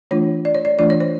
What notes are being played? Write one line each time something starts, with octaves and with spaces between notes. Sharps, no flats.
E3 A3 D4 F4 C#5
D5
C#5
D5
E3 A3 D4 F4 D5
C#5
C5